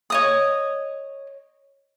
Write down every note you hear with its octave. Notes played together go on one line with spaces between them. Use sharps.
C#5 D#5 D#6